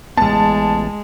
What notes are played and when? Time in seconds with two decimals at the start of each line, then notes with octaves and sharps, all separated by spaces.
0.17 A1 G#3 B3 A5